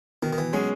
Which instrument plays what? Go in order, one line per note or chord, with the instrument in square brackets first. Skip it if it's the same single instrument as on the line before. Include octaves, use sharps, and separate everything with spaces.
[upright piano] B2 [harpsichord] D#3
[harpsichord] D#3
E3
[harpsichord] F#3 [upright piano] G#3 C#4 G#4